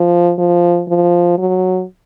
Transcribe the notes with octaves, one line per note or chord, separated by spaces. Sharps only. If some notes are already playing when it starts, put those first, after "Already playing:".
Already playing: F3
F3
F3
F#3